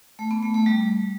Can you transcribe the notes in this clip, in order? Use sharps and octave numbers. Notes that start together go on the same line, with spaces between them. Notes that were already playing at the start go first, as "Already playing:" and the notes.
A3
B3
A3
A3
G3